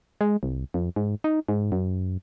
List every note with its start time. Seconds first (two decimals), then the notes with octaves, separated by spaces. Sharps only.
0.21 G#3
0.43 C2
0.74 F2
0.96 G#2
1.24 D#4
1.48 G#2
1.72 F#2